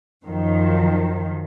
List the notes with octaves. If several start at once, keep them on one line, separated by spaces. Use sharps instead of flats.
F#2 D#3 F3